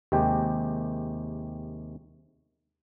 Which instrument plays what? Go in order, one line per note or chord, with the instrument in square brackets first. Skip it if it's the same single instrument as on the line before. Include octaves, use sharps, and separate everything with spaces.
[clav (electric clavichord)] D#2 C3 G#3 G4 G5